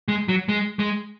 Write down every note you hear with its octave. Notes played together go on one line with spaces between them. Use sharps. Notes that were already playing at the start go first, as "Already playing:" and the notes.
G#3
F#3
G#3
G#3